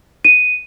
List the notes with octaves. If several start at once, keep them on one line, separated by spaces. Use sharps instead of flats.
D#7